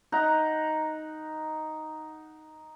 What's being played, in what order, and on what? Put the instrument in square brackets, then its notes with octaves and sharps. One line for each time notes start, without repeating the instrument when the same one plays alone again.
[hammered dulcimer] D#4 F#5 A#5